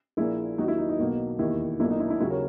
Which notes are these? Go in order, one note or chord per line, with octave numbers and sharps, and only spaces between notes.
A#1 A#2 A#3 E4 G#4
D#2 D#3 F#3 D#4 F#4
E4
D#4
D#4
B1 B2 A#3
E1 D#2 D#3 E4
B1 A#2 A#3 E4
D#4
E4
E4
D#2 C#3 F#3 A#3 E4
A#4 C#5